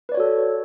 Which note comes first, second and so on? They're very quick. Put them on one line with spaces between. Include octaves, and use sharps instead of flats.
B4 D5 C#5 F#4 A4